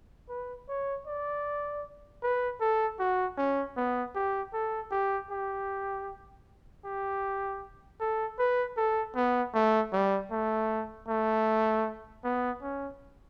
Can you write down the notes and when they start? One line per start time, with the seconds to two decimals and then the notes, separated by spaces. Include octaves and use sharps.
0.29 B4
0.68 C#5
1.07 D5
2.23 B4
2.61 A4
2.99 F#4
3.38 C#4
3.77 B3
4.15 G4
4.54 A4
4.91 G4
5.30 G4
6.85 G4
8.00 A4
8.39 B4
8.77 A4
9.16 B3
9.54 A3
9.93 G3
10.31 A3
11.08 A3
12.24 B3
12.62 C#4